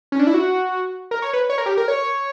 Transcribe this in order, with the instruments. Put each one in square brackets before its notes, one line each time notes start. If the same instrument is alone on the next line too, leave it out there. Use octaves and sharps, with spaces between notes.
[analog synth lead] C#4
D4
E4
F#4
A#4
C#5
B4
C#5
A#4
G4
A#4
C#5